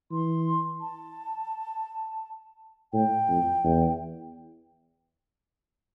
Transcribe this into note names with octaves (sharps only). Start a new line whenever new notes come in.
E3 C6
A5
A2 G5
F2
E2